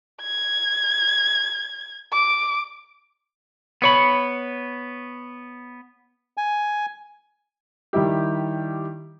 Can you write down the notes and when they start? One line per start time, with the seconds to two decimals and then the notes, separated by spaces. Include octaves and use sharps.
0.23 G#6
2.13 D6
3.82 B3 C#5 B5
6.37 G#5
7.93 D#3 G3 E4 G4